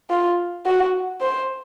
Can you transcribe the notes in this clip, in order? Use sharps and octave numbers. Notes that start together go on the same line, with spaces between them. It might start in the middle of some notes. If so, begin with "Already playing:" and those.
F4
F#4
C5